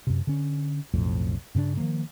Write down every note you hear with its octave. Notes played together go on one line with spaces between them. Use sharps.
F#2 C3
D3 C#4
B1 F2 A2
G2 C#3 A#3 D4
D#3 F3 A#3